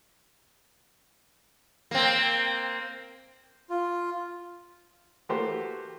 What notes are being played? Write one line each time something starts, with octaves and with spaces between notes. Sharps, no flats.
A#3 C4
F4
E3 A3 A#3 F#4 G4 C5